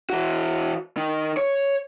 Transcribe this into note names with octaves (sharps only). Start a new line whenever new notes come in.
E3 F#4
D#3
C#5